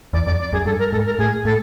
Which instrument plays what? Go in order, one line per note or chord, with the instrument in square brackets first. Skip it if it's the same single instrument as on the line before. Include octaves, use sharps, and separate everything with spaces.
[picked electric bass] E2 [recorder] D5
[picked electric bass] F2 [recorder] D5
[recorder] D5
[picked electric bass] F#2 [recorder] G#4
[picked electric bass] G2 [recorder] A4
[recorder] A#4
[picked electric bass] G#2 [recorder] A4
[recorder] A#4
[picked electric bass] A2 [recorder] G#4
[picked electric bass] A2 [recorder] A4